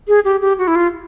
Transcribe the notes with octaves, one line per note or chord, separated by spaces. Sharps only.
G#4
G4
G4
F#4
E4
F4